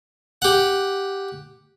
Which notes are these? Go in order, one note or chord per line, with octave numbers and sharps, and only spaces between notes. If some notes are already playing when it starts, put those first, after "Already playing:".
G4 F#5